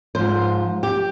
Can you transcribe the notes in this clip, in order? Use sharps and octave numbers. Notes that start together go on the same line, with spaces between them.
G#2 F3 C5
G4